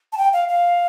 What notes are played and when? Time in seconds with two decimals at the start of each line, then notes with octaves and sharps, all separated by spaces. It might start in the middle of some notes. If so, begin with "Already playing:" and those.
0.13 A5
0.18 G5
0.33 F5
0.49 F5